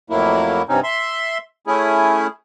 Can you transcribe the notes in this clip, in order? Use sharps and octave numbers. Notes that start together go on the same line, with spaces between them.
F2 A2 F#3 A#3 E4
G2 C3 C4 C#4 D#4
E5 C6
A3 C#4 E4 G#4